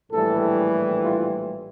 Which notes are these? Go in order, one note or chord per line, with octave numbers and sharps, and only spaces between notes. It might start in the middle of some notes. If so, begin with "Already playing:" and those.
A#1 A2 E3 G3 A4
F4